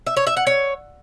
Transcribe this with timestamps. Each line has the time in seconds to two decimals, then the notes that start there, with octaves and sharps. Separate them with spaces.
0.07 E5
0.17 C#5
0.27 E5
0.37 F#5
0.47 C#5